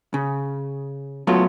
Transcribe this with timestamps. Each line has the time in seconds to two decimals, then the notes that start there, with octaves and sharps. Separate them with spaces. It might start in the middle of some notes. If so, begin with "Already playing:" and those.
0.14 C#3
1.27 F#3 A3 B3 F4